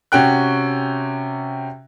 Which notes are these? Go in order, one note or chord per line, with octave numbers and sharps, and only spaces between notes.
C3 C#4 F#4 G5 F#6